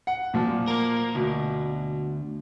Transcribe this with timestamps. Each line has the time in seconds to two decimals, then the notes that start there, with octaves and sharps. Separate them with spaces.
0.07 F#5
0.34 A#2 F3
0.68 A#3 A#4
1.15 D2 B2